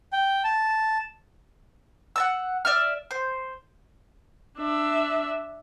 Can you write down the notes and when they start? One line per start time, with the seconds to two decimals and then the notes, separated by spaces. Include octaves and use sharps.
0.13 G5
0.44 A5
2.16 F#5 A5 E6
2.65 D5 E5 F6
3.11 C5
4.59 D4 E5